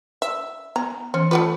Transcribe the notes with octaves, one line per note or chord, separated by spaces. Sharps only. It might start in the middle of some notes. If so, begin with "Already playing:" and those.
E5
B3 A#5
E3 C#4
A3 B3 F4 B4